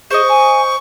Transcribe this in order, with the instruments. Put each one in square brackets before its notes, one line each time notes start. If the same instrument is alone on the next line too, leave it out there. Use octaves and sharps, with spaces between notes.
[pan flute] G#4 [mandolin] C5 D#5 [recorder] C#6
[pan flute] G#5